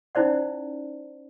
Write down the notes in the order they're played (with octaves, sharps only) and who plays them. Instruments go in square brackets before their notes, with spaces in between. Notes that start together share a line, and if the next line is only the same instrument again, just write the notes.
[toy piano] C#4 D#4 E4 C5 D5 F#5